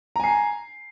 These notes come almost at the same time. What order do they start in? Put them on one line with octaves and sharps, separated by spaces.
A#5 G#5 C7